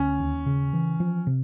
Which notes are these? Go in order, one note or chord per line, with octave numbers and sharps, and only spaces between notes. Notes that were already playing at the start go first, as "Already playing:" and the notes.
Already playing: D2 C#4
D#2
C#3
E3
F3
C3